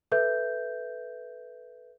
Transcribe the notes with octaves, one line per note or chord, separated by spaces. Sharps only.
A4 B4 E5 G6